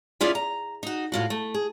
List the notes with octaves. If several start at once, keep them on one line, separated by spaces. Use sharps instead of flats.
C#4 E4 F4 G#4 D5
A#5
D#4 F#4
A2 F4 F#4
A3
G#4